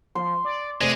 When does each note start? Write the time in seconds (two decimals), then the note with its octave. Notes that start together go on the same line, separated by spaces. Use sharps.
0.15 F3 C6
0.45 D5
0.81 C3 G#3 A3 G#4 C5 D5